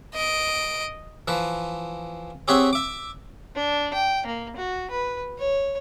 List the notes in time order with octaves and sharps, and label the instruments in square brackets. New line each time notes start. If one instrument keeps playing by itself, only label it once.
[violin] D#5 D7
[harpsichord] E3 F3 B4
C4 G4 G#4 C#5 E5 F#5
E5 D6
[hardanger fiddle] D4
G5
A#3
F#4
B4
C#5